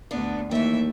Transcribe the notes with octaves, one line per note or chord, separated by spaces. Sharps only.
D2 B3 D4
D#2 E3 G3 A3 E5